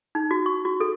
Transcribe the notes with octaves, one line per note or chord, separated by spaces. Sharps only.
D#4
F#4
C#6
F#4
A4